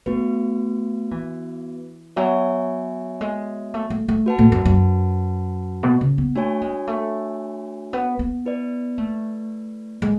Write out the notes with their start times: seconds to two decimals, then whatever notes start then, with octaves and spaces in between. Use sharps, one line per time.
0.06 A3 B3 F#4 B4
1.11 E3
2.16 F#3 B3 F#4 C#5 E5 G#5
3.21 G#3
3.74 A3
3.90 A3
4.08 A3
4.26 F#4 B4 F#5 A5
4.39 A2
4.52 F#2
4.65 F#2
5.83 B2
6.01 C#3
6.18 B3
6.35 A3 D4 F#4 C#5 G#5
6.61 G#3
6.87 A3
7.93 B3
8.19 B3
8.45 E4 B4 D5
8.98 A3
10.02 G#3